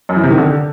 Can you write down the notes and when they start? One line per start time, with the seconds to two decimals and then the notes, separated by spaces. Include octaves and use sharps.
0.09 F#2
0.16 E3
0.24 C3
0.31 D#3
0.38 D3